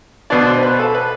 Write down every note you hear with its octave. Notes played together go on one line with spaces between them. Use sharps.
B2 B3 D4 D5
C5
B4
A4
B4